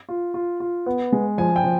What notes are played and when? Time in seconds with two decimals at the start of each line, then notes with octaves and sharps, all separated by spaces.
0.09 F4
0.34 F4
0.60 F4
0.86 B3
1.12 G#3
1.38 F3 G#5
1.56 G5
1.64 F3